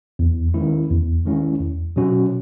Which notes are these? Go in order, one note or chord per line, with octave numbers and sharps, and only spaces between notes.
E2
D#3 G#3 C#4 E4
E2
D#3 G#3 C#4 E4
E2
B2 F#3 C#4 F#4